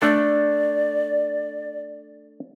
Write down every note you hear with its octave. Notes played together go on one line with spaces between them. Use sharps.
A3 D4 A4 D5